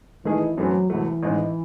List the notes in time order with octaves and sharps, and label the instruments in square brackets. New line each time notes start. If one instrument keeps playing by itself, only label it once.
[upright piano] D#3 A3 D#4 G#4 [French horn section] E3
[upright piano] F#2 E3 A3 C4 [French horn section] F#3
[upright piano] C2 C3 F#3 A3 [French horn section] E3
[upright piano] A1 G#2 D#3 G#3 C4